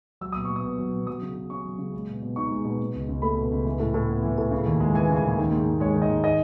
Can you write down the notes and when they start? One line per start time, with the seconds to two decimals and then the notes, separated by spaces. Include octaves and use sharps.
0.21 F#3 E6
0.32 B2 D#6
0.45 C#6
0.50 B2
0.56 D#6
0.64 B3
0.78 F#3
0.93 B2
1.07 F#3 D#6
1.22 C#3
1.36 C#3
1.50 C#4 C#6
1.65 F#3
1.79 C#3
1.93 G#3
2.08 B2
2.22 B2
2.36 D#4 C#6
2.51 G#3
2.65 B2
2.79 B2
2.94 C#2
3.09 C#2
3.22 A3 B5
3.36 B2
3.52 C#2
3.65 E3
3.80 A2
3.94 A2
4.08 B3
4.23 E3
4.38 A2
4.51 C#3
4.66 D#2
4.80 G#3
4.94 E3 G#5
5.09 C#3
5.16 G#5
5.23 D#2
5.38 D#3
5.51 G#2
5.66 G#2
5.80 G#3 C#5
5.95 D#3
6.02 D#5
6.10 G#2
6.24 D#3 D#5